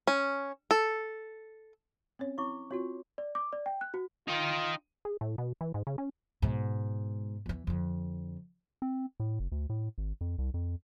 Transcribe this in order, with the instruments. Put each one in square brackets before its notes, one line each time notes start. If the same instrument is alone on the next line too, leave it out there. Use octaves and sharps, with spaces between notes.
[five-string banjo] C#4
A4
[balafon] C4 C#4 C#5
[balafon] C4 C#5 [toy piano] E4 C#6 D6
[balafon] C4 F4 [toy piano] F#4 C#5
[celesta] D5
D6
D5
G5
F#6
F#4
[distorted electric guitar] D#4 G5 [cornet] F4
[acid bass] G#4
A2
B2
E3
G#2
C#3
C#4
[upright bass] G#2 B2
E2 E3
F2 D3
[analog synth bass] C4
A2
F#1
D2
A2
G#1
F2
C2
F2